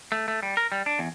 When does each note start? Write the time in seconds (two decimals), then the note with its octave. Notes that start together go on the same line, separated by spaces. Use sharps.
0.12 A3
0.28 A3
0.43 G3
0.57 A#4
0.72 G3
0.86 D4
0.99 E2